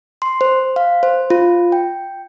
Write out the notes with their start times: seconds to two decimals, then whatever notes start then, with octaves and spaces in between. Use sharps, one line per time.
0.22 C6
0.41 C5
0.76 F5
1.03 C5
1.30 F4
1.72 G5